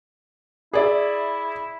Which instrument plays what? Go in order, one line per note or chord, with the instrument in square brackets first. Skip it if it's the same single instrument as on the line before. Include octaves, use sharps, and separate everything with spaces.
[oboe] E4 [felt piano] G#4 D5 E5